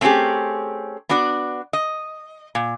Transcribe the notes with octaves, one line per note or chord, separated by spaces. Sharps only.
A3 C4 C#4 E4 G4 G#4
B3 D4 F#4 D5
D#5
A#2